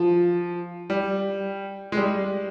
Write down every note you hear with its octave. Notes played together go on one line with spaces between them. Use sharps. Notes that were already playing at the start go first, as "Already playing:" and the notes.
Already playing: F3
G3
G#3
G3